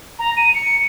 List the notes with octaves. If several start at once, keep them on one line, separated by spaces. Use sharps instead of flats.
A#5
D#7
C#7